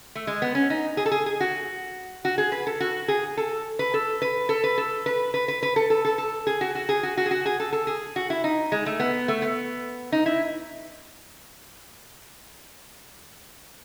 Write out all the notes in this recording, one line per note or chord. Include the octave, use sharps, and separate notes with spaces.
A3
G#3
B3
C#4
D#4
G#4
A4
G#4
G#4
F#4
F#4
G#4
B4
A4
F#4
G#4
A4
B4
A4
B4
A4
B4
A4
B4
B4
B4
B4
A4
A4
A4
A4
G#4
F#4
F#4
G#4
F#4
F#4
G#4
F#4
G#4
A4
A4
G#4
F#4
E4
D#4
G#3
A3
B3
A3
B3
D#4
E4